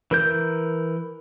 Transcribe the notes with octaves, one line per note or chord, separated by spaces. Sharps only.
E3 A#4 G6